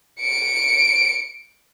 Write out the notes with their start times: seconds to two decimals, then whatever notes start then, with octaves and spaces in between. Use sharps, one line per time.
0.21 C#7 D7